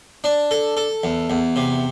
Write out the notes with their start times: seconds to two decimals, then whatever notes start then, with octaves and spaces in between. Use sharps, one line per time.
0.24 D4
0.51 A4
0.77 A4
1.04 E2
1.30 E2
1.56 C3